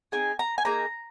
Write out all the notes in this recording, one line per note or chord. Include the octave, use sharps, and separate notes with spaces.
C4 D#4 G#4 G#5
A#5
G#5
A#3 D#4 G#4 A#5